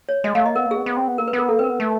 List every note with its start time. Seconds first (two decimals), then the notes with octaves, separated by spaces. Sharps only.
0.09 C#5
0.24 G#3 D#5
0.35 A3 F5
0.45 A#3 D#5
0.55 B3 A#4
0.66 A#3
0.71 G#4
0.76 B3
0.86 B3
0.97 C4
1.08 B3
1.18 A#3 A#4
1.28 B4
1.33 B3 A#4
1.48 A#3 A4
1.59 C4 A#4 B4
1.70 B3
1.80 A3